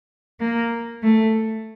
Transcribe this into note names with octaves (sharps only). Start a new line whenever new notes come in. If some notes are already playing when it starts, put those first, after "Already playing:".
A#3
A3